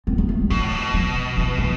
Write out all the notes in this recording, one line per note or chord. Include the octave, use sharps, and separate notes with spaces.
C4
B3
A3
G3
B2 F3
A2
B2
F3
E3
E3